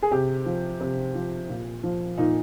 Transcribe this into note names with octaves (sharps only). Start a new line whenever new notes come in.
G#4
C3 G4
F3
C3
F3
A#2
F3
A#2 D#4